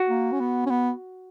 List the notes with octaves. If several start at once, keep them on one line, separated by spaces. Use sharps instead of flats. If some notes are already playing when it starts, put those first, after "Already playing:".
Already playing: F#4
A#3
C#4
B3
C#4
B3